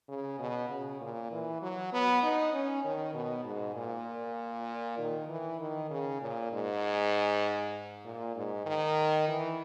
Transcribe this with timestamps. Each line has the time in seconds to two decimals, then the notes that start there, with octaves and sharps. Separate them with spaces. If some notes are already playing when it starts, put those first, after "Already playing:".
0.08 C#3
0.39 B2
0.70 C#3
1.01 A#2
1.32 E3
1.62 F#3
1.93 B3
2.23 D#4
2.54 C#4
2.85 D#3
3.14 B2
3.45 G#2
3.76 A#2
4.98 D#3
5.29 E3
5.60 D#3
5.91 C#3
6.22 A#2
6.53 G#2
8.05 A#2
8.36 G#2
8.66 D#3
9.28 E3